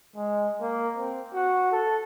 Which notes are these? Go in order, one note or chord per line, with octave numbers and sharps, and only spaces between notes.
G#3
A#3
C4
F#4
A4